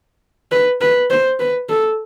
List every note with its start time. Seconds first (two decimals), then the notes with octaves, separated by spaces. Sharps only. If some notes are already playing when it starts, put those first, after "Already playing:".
0.52 B4
0.81 B4
1.10 C5
1.40 B4
1.69 A4